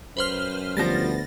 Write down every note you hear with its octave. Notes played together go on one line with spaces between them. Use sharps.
F#2 B4 C5 F6
D2 F3 G3 B3 A6 A#6